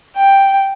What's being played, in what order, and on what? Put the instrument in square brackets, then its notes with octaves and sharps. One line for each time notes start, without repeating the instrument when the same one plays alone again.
[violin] G5